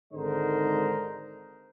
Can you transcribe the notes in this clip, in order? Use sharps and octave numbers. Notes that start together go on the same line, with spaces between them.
G#1 G#2 D3 A#4 C5 D#5